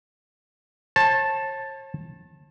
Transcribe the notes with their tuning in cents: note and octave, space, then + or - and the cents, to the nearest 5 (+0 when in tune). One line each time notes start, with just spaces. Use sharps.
C#5 -45 A5 +0